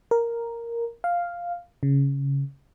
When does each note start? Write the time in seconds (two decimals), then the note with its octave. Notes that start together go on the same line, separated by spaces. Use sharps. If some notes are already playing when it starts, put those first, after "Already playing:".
0.11 A#4
1.04 F5
1.83 C#3